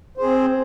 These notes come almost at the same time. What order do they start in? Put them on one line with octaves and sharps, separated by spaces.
C5 G#4 C4